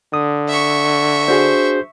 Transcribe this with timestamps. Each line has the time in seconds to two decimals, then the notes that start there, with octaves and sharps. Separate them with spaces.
0.14 D3 D#6
0.49 E5 C#6
1.28 D4 F#4 G#4 C5